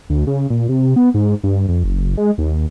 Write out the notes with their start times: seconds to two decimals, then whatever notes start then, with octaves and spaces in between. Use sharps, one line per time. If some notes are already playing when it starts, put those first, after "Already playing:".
0.10 D2
0.27 C#3
0.50 A#2
0.69 C3
0.96 B3
1.14 G#2
1.43 G2
1.68 F2
1.84 F#1
2.17 G#3
2.38 D#2